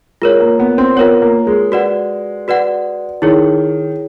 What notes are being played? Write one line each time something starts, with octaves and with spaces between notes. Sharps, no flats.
G#3 F4 A#4 C#5
A#3
B3
C4
B3 F4 A#4 C#5
A#3
G#3
F#4 B4 D5 F#5
F#4 B4 D5 F#5
D#3 E4 G#4 C#5